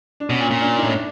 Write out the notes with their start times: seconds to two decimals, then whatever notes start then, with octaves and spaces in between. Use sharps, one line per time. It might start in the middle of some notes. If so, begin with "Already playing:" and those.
0.20 D4
0.30 B2 C#4
0.40 A#2
0.51 A#2
0.61 D4
0.78 A2 D#4
0.92 D4